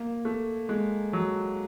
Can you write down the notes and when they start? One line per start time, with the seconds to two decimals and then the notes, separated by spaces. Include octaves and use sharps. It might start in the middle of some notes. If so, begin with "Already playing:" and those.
Already playing: A#3
0.25 A3
0.69 G#3
1.13 F#3